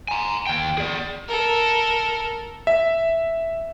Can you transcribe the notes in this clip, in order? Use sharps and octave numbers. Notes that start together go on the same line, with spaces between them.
G#5 A#5
D#2 G5
G#4 D5
A4 A#4
E5